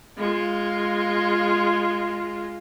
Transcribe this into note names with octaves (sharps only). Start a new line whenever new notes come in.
G#3 F4